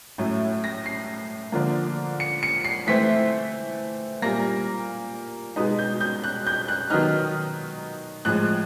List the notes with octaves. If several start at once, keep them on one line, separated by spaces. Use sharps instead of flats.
A2 F#3 A3 C#4 E4
A#6
C7
D3 F3 A#3
C#7
C#7
C7
E3 A3 C4 E4 B6
A#2 G3 A#3 A#6
B2 G#3 B3 D#4
G6
G6
F#6
G6
F#6
D#3 F#3 B3 D#4 F6
A2 F3 G#3 F#6